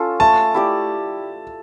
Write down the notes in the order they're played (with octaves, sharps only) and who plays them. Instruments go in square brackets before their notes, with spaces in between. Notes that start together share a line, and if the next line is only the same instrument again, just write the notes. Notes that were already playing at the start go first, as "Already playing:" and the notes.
Already playing: [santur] C#4 F4 A4
[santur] A3 [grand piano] A5
[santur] E4 G4 D5